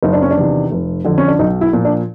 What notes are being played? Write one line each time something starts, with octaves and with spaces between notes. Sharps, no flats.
F#1 D#4
D4
C#4
D4
E2 C3 D#3
F1
F2 D3
C#4
D4
B1 D#4
E4
A#2 F3
D4